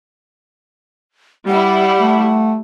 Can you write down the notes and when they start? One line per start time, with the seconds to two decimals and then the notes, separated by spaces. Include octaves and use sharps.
1.48 G3 E4 F#5
1.99 A3